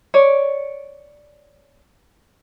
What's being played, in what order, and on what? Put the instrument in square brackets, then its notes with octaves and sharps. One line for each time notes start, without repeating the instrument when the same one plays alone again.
[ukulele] C#5 D5